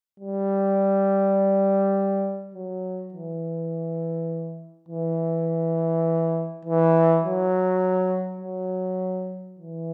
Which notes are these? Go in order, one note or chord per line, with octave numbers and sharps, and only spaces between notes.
G3
F#3
E3
E3
E3
F#3
F#3
E3